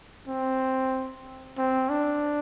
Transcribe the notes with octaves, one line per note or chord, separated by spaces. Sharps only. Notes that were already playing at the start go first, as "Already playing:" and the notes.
C4
C4
D4